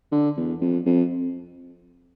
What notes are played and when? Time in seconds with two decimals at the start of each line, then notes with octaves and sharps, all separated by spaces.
0.12 D3
0.37 E2
0.61 F2
0.86 F2